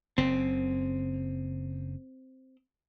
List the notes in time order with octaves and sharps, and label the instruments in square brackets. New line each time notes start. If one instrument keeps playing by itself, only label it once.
[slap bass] F#1 C#3 [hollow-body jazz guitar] C4